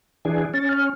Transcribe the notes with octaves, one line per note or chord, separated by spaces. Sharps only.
E3 D4 G#4
C#4 A6
F6